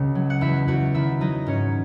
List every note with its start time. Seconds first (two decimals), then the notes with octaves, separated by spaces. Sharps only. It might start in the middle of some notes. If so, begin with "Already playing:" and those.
Already playing: C#2 C#3 F#4
0.15 F#3
0.30 F#5
0.41 E2 E4 E5
0.68 E2 F#4 F#5
0.94 D#3 E4 E5
1.21 F#3 D#4 D#5
1.46 G#2 C#4 C#5